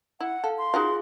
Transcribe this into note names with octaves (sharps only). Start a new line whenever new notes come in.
E4 F#5
A4 F5
C6
D#4 F4 F#4 G#4 F5